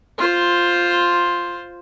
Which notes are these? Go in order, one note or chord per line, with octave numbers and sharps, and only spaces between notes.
F4 C5